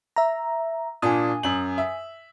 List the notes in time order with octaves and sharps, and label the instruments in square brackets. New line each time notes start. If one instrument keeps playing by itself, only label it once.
[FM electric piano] E5 A#5
[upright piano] A#2 D4 [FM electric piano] G#5 D#6
[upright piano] F#2 F#7
E5